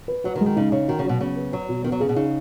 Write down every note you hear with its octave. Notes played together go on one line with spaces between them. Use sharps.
B4
F#3 F#4
D#3
G#3
D#3
C#3 D#4
C#3 C#5
D#3 F#4
C#3
B2 F#3
C#3 B3
B4
F#3 F#4
B2
D#3 B3
F#3
C#3 G#4
B2
C#3 D#4